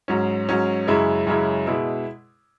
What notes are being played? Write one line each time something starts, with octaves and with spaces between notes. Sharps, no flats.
G#2 F#3 C#4
G#2 F#3 C#4
F#2 C#3 G#3 E4
F#2 C#3 G#3 E4
B2 G#3 E4